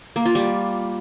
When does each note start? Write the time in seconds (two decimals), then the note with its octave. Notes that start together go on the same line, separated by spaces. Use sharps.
0.16 A#3
0.26 F4
0.35 G3